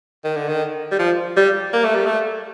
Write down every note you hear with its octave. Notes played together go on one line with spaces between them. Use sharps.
D#3
D3
D#3
G3
F3
G3
A#3
A3
G3
A3